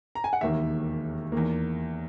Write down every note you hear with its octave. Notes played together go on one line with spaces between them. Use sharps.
A#5
G#5
F#5
E1 D#2 D#3 A#3 E5
E2 D#3 A#3